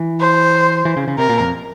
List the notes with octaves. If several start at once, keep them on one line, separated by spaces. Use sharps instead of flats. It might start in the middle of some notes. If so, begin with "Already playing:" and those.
Already playing: E3
C5
E3
C#3
C#3
C3 A#4
A#2
F2